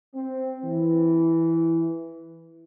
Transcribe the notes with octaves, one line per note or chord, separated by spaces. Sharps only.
C4
E3